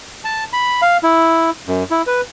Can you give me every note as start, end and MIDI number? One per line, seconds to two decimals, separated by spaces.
0.24 0.44 81
0.53 0.81 83
0.82 0.97 77
1.03 1.50 64
1.68 1.84 42
1.91 2.02 64
2.07 2.21 71